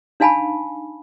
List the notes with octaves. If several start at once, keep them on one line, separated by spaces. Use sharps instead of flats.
D4 D#4 F5 G#5 A5 B5